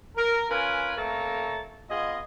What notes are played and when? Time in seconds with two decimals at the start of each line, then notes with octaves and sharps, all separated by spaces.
0.16 A#4
0.50 C#4 F4 A#4 B4 G#5
0.97 C3 A3 A#3 A4 C#5 A#5
1.89 B3 F4 G#4 D#5